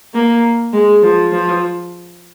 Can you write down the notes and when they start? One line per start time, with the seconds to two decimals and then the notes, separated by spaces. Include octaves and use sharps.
0.14 A#3
0.73 G#3
1.02 F3
1.32 F3